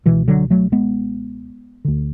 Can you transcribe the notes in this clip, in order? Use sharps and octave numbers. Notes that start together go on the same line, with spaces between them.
C#2 B2 E3
D3 F#3
F#3 A3
G#3 B3
D2 D3